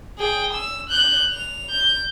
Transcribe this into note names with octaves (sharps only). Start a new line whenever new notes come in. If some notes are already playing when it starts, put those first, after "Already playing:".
G#4 G5
E6
F#6 G6
F7
G6